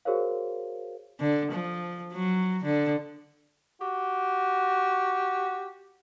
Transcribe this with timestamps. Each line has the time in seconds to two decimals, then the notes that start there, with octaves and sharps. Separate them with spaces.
0.05 F#4 G#4 A#4 C5 C#5 F5
1.20 D3
1.52 F3
2.13 F#3
2.64 D3
3.81 F#4 G4